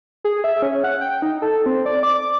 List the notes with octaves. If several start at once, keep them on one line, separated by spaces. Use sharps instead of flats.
G#4
E5
C#4
F#5
G5
D#4
A4
C4
D5
D6